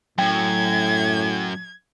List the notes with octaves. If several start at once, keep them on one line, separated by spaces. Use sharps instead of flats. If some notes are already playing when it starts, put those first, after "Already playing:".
F#2 A2 G5 G#6